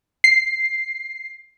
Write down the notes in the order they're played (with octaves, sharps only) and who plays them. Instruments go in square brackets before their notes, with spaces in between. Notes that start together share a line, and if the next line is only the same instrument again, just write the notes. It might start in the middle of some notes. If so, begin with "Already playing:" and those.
[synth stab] C7